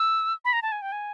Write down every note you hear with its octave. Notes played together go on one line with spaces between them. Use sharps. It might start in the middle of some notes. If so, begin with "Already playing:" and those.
Already playing: E6
B5
A#5
A5
G#5
G5
G#5